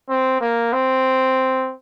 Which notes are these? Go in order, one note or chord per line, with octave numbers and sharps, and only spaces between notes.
C4
A#3
C4